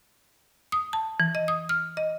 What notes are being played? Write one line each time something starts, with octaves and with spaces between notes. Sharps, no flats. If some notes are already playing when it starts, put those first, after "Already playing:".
D#6
A5
E3
D#5
D#6
F6
D#5